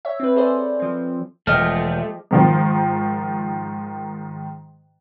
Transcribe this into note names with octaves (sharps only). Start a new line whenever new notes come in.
C#5 E5
C4 B4
G#4 A4 C5 D5
F3 C4
E1 F3 G#3 A3 G4 D#5 F6
G#2 D#3 F3